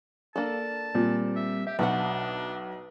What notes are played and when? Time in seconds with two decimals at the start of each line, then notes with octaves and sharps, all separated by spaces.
0.36 A#3 D4 A4 A5
0.95 A#2 G3 C4
1.36 E5
1.67 G4 E5
1.79 B1 B2 B3 D4 F#4 F#5